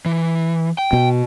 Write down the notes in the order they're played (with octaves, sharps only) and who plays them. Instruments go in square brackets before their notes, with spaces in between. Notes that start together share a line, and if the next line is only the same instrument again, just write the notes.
[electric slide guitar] E3
G5
[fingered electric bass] B2